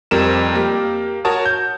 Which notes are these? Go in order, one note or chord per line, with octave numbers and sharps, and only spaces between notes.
F2 G3 A#4 E7
A#3 G4
F#4 A#4 C#5 A5 D#6
G6